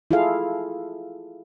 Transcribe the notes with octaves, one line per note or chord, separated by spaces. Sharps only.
E4 F4 G#4 A4 F5